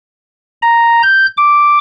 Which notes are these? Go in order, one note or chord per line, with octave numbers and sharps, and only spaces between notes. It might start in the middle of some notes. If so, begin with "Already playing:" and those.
A#5
G6
D6